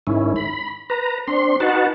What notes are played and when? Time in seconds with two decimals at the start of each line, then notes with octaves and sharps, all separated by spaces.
0.07 G#2 D#3 C#4 E4
0.36 B5
0.90 B4 A#5
1.28 C4 D4 C6
1.60 D#4 F#4 B4 F#5 A5